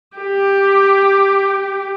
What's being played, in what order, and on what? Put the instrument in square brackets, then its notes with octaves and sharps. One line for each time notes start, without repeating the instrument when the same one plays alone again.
[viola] G4